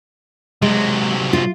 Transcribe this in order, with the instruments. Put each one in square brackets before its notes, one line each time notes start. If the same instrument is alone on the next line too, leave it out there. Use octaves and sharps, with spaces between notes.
[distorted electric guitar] C3 F#3 [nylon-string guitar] G#3
[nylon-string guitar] F4